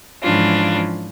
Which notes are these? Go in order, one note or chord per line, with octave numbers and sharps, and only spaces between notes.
G#2 E3 F3 C#4 D4 F4